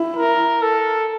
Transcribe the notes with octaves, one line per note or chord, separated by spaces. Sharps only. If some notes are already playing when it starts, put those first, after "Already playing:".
Already playing: E4
A#4
A4